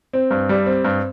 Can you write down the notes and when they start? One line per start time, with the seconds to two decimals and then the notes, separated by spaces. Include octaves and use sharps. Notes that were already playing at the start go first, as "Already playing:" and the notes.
0.13 C4
0.31 G2
0.49 G3
0.66 C4
0.85 G2